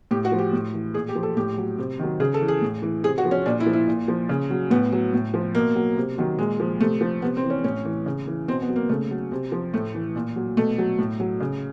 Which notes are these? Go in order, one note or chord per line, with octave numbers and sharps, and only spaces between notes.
A2 G4
F#4
F3
G4
A2
E3
A#2 G#4
G4
F3
A4
A2 G4
F#3
C3
D#3 F#3
C#3 G#4
A4
E3
G#4
A2
E3
C3 G#4
F#4
F3
C#4
A#2 D4
E4
F3
E4
A#2
F3
C#3
F#3
A2 B3
F#3
A2
F3
B2 A#3
F#3
C3
D#3 F#3
A#2 G#3
F3
C3 A3
F3
C3 B3
C4
E3
C#4
A2 C#4
E3
C#3
E3
B2 C4
B3
F#3
A#3
C#3 A3
F#3
C3
F3
A2 A3
E3
A#2
F#3
B2 A3
F#3
A2
F#3
C#3